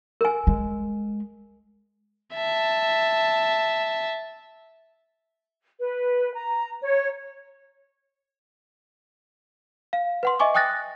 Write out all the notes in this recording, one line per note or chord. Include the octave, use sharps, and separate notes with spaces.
A#4 G#5
G#3
E5 A5
B4
A#5
C#5
F5
B4 F#5 C6
D#5 E5 G#5 C#6 D6
G5 G#5 D#6 F#6 A6 A#6